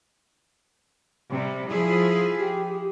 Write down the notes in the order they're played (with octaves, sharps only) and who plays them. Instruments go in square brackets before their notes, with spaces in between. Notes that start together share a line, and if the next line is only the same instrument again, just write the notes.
[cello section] C3 G3
F3 E4 G#4
[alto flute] G4